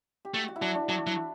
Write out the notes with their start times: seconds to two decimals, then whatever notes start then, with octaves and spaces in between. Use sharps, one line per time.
0.25 G4
0.34 A3 F#4
0.48 F#4
0.56 E4
0.61 F#3 D4
0.75 D4
0.89 F#3 D4
1.07 F#3 E4